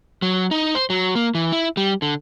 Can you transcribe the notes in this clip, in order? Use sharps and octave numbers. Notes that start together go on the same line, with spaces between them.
F#3
D#4
C5
F#3
A#3
E3
E4
G3
D3